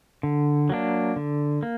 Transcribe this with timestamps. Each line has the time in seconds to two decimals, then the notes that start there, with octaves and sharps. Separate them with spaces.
0.23 D3
0.70 F#3 A#3 D4
1.16 D3
1.63 A#3